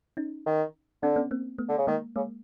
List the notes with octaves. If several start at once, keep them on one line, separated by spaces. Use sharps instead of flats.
C#4 D#4
D#3
D3 C4 D4
B3 C#4
A#3 C4
A3 B3
D3
C#3
D#3 G#3 A#3
C#3 G#3 A#3